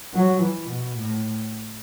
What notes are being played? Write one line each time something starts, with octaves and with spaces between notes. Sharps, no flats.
F#3
E3
B2
A2